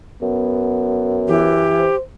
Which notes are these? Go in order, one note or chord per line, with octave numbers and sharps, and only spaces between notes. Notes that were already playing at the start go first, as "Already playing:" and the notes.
F#2 B3
E3 G4
C5